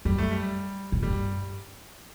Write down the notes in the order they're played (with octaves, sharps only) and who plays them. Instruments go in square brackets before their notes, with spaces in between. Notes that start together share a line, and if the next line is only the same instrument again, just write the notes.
[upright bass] F#2 [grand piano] G3
[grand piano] A3
G3
[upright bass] A2
[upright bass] G2 [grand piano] G3